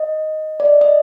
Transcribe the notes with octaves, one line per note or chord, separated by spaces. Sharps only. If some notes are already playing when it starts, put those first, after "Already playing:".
Already playing: D#5
D5
D#5
D#5